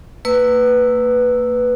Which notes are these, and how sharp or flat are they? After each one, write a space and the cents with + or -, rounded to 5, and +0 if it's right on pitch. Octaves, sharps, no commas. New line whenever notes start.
A#3 -35 B4 +0 E6 +0